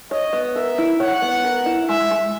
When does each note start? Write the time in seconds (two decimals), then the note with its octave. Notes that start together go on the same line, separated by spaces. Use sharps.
0.11 C#5 D#5
0.33 B3
0.55 A#4 E5
0.78 E4
1.00 C#5 F#5
1.22 B3
1.45 A#4
1.66 E4
1.88 G#3 E5
2.11 G#3